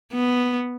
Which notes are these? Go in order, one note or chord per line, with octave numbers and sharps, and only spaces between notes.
B3